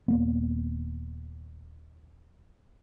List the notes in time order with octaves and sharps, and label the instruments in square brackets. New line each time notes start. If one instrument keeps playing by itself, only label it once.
[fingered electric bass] D#1 A#3 B3